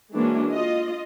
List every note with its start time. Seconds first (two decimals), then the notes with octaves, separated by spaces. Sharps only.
0.13 E3 G#3 A#3 C#4 D4 F#4
0.52 F4 D#5